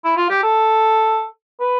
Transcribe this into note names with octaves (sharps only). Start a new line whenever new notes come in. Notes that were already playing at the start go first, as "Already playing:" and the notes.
E4
F4
G4
A4
B4